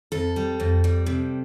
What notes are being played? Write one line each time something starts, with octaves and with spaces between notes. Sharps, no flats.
F2 A4
G3
F2
G3
C3